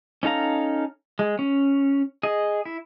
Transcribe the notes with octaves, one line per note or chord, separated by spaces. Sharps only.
C#4 D#4 A4 F5 A#5
G#3
C#4
G#4 D#5
E4